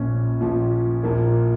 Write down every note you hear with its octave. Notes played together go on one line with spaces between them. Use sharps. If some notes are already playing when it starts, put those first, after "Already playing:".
Already playing: A#1 A#2 F3 C#4
A#1 A#2 F3
A#1 A#2 F3 A#3